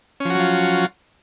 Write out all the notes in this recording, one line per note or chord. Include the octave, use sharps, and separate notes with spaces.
F3 F#3 C#4 F4 F#4